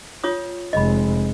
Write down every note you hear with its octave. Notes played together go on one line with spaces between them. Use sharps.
F4 C#5 D#6
F1 G#3 D#5 B5